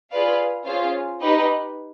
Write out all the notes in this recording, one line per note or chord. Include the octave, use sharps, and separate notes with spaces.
F4 G#4 B4 D5 F5
C#4 F4 G#4 C5 F5
D#4 G4 B4 D#5